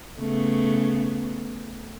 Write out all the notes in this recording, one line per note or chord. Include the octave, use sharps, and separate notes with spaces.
C#3 A3 B3